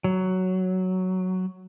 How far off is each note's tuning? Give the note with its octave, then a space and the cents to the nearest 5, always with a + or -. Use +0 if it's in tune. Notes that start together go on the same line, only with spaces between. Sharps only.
F#3 +5